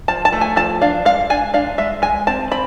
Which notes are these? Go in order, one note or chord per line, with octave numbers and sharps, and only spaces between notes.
F3 A5
A5
A3
G#5
F3 A5
D4 F5
G#3 F5
D4 G#5
D4 F5
G#3 E5
G#3 G#5
C4 A5
C4 B5